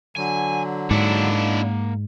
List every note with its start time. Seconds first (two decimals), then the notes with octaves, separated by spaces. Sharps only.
0.16 D3 F#3 G#5
0.91 G#2 A#3 D4 E4 F#5